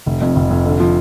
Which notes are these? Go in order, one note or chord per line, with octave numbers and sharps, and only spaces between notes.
F1
F2
F1
F2
D3
F3